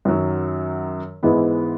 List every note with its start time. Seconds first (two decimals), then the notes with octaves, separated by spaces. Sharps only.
0.05 F#2 D#3 F#3
1.23 G#2 E3 G#3 B3 E4